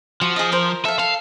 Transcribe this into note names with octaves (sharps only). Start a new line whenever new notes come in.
F3 F#4
G#4 D#5
A#4 C5
A4 E5 F5
A4 F5